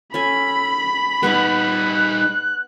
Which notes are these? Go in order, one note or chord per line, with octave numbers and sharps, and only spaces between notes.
C#4 A4 G#5 B5
G3 B3 D#4 C#6 D6 F#6